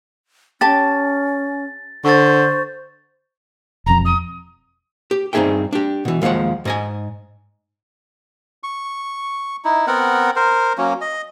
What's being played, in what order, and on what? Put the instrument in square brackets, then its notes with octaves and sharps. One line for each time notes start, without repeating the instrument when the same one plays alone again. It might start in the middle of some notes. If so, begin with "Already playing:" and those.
[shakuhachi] C#4 [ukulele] G4 A5 [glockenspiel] A6
[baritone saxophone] D3 [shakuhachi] C5 [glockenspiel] C#6 A6
[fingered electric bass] E1 F2 [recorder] A#5
[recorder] D#6
[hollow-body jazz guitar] G4
G2 C4 D#4 G#4 E5 G5
D4 G4
B2 E3
D#2 E3 F3 G#3 F#5
G#2 D#5 G#5
[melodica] C#6
D#4 E4
B3 C4 A#4 F#5
A#4 C5
F#3 A#3 C#4
D#5